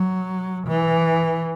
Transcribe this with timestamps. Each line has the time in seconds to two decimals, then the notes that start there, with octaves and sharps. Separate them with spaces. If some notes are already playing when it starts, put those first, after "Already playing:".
Already playing: F#3
0.66 E3